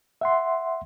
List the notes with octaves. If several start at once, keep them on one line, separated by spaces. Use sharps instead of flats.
E5 F#5 C6